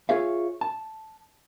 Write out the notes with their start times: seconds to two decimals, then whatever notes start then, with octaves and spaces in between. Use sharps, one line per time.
0.09 F4 G#4 C#5 E5 F5
0.61 A5